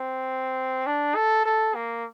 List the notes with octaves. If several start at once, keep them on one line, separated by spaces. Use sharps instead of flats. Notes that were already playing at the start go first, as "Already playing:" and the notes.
Already playing: C4
D4
A4
A4
A#3